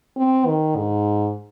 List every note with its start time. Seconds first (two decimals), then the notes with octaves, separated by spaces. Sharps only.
0.17 C4
0.46 D#3
0.76 G#2